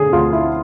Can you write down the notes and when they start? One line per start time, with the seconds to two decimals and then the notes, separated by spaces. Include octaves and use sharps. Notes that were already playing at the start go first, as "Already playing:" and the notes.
Already playing: D3 G#4 A4
0.13 D2 F4
0.32 E4